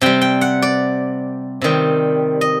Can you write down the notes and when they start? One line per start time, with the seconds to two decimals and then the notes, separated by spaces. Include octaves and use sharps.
0.01 C3 G3 G5
0.21 G5
0.41 F#5
0.62 D5
1.61 C3 D#3 G3
2.41 D#5